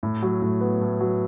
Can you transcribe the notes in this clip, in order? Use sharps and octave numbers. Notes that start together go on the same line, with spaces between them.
A2
F#3
A2
B3
A2
F#3